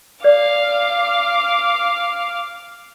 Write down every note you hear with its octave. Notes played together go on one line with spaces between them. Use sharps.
D5 F5 D6